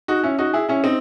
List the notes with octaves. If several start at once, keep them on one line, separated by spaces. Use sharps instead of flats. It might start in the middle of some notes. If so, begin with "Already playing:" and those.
D#4 F#4
C#4 E4
D#4 F#4
E4 G#4
C#4 E4
C4 D#4